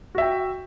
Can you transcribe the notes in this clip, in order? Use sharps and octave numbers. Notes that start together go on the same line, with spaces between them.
F#4 E5 G5